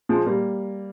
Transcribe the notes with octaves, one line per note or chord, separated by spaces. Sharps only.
F3 G#3
G3 A#3